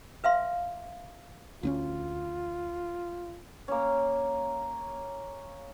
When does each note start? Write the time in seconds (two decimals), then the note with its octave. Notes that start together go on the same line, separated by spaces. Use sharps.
0.24 B4 E5 F5 C6
1.63 D2 C4 C#4 F4
3.68 A#3 C#4